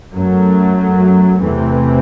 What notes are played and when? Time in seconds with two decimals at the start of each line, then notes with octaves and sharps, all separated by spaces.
0.14 F#2 F#3 A3
1.39 E2 C3 E3 A3 C4